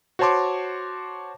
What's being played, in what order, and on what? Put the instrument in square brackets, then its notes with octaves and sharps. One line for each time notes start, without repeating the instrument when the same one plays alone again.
[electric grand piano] F#4 C5 C#5 A5 C6 D6